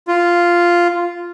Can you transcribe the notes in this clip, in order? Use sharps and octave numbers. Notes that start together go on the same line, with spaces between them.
F4